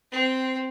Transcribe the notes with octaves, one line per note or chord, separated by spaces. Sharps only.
C4